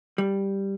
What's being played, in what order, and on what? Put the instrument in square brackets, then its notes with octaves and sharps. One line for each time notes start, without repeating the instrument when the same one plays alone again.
[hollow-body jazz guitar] G3